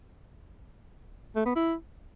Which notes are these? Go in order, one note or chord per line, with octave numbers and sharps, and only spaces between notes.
A3
B3
E4